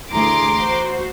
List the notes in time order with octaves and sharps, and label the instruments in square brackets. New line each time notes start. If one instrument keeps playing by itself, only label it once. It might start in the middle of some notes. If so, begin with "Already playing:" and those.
[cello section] D2 E3 G#4 [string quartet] A#5 [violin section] C6 D6
[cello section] F#4 C5